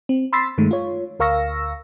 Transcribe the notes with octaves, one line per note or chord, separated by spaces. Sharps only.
C4
B5 C6 E6 A6 B6 C7
G2 D#3 G#3 A3
F4 C#5
D2 A#4 F5 C#6 E6 A#6